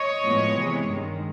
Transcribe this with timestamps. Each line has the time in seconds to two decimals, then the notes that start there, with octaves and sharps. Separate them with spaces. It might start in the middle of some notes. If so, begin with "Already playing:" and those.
Already playing: C#5 D#5
0.24 A2 F3 G#3 B3
0.56 C3 E3 G#3
0.87 G2 D#3 G#3